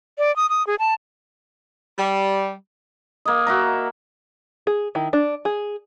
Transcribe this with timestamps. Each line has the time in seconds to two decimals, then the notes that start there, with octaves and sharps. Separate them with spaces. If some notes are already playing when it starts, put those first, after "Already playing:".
0.18 D5
0.36 D#6
0.49 D#6
0.67 G#4
0.79 A5
1.98 G3
3.25 A#3 D#5
3.47 F#4 E5 A#5
4.67 G#4
4.95 D#3 E4
5.13 D4
5.45 G#4